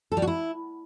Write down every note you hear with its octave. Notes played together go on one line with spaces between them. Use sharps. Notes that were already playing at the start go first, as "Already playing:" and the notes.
A4
G3
F#4
E4